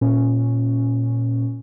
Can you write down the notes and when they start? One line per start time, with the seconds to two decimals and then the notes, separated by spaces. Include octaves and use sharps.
0.01 A#2 C#4